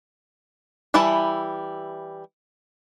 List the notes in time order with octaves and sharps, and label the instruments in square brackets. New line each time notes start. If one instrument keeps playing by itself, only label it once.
[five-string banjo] E3 G3 E4 A5